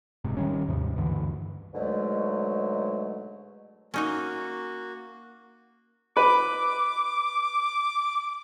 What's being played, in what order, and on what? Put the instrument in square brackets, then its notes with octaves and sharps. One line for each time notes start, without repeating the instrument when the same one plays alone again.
[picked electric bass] F1 G#2 C3
D#3 G3 C#4
D#2 G#2 C3 F3
D2 G2 D3 E3
[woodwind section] G#2 B2 D3 F#3 G#3 A3
[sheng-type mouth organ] A#3 F#4 [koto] C#4 D#4 C#5
[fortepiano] B4 [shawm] D6